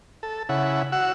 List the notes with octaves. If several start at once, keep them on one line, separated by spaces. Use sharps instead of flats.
A4
C#3 E4 F#5
F#4 F#5 E6